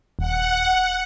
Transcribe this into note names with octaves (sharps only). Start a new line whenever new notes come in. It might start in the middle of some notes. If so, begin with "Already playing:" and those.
D#1 F#5